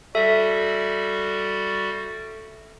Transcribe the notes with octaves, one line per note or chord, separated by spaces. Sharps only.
G3 F#4 A4 E5